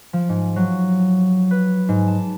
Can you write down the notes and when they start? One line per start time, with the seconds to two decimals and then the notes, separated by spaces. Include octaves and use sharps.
0.13 F3
0.29 G#2
0.56 F#3
1.51 B4
1.89 G#2
2.08 A5